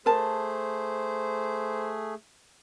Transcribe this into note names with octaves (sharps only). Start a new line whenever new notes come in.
A3 G#4 A#4 C5 A5